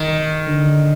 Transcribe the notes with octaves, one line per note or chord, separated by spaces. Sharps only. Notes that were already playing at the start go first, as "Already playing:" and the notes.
Already playing: D#3
D3